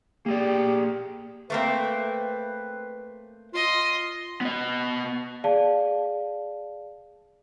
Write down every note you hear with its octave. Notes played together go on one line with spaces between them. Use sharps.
A#3 G4 G#4 D5
A3 A#3 C4 B4
F4 D#5 C6
B3 D#5
G#4 D5 F5 A5